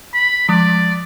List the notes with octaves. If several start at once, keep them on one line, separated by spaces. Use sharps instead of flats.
B5
F3 G#3 D5